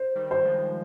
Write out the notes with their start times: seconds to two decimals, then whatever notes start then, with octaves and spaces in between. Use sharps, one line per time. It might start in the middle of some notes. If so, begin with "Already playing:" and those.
Already playing: C5
0.15 D#3 G3
0.31 C5
0.45 F3 G#3